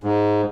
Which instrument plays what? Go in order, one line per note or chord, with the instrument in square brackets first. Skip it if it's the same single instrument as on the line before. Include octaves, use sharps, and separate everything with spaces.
[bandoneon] G#2